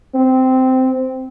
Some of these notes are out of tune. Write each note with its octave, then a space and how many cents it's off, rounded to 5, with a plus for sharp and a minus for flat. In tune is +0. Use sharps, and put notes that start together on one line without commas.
C4 -10